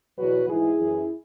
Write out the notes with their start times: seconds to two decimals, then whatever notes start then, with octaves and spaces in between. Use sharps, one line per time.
0.17 E2 B2 F#3 F#4 B4
0.47 G#2 E3 E4 G#4
0.77 F#2 E3